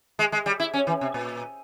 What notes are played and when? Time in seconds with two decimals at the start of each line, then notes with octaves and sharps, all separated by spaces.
0.19 G#3
0.32 G#3
0.46 G3
0.60 E4
0.74 C#4
0.87 E3
1.01 C3
1.14 A#2